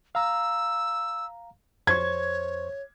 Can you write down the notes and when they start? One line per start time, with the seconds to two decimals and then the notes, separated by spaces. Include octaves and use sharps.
0.15 F5 A#5 E6
1.87 F2 C5 C#5 C#6 G#6